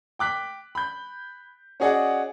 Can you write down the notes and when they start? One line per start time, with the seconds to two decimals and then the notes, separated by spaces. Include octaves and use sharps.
0.19 G5 D6 F#6 B6
0.75 B5 G6
1.80 C#4 F#4 G#4 D5 D#5 F#5